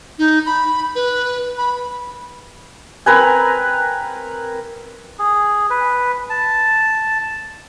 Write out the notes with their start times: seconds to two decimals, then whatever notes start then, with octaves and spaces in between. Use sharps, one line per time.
0.19 D#4
0.46 B5
0.95 B4
1.58 B5
3.06 C4 A#4 B4 G#5
5.19 G#4
5.70 B4
6.30 A5